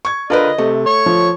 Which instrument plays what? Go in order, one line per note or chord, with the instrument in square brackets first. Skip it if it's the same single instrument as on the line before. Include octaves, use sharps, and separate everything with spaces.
[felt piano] C#6 G#6
[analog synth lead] D3 [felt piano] F4 A#4 B4 [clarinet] D#5
[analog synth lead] C3 [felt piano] A3
[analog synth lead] C#5 [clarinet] C#6
[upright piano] F3